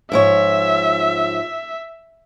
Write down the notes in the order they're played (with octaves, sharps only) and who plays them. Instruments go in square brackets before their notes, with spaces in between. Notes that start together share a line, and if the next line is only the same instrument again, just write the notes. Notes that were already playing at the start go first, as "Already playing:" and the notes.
[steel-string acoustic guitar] G#2 F3 C#5 [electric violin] E5